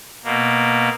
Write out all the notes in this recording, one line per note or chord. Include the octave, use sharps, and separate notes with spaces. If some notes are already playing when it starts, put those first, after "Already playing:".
B2 A#3